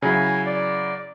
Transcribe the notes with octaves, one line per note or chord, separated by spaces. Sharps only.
C#3 F#3 E4 G#5
D5